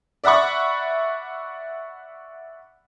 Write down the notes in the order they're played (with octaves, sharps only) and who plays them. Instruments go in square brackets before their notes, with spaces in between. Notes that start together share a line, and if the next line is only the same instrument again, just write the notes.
[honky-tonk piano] D5 E5 F#5 B5 C#6